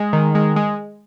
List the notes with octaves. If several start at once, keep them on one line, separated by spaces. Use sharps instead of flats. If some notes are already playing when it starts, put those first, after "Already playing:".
Already playing: G#3
D#3
G#3
G#3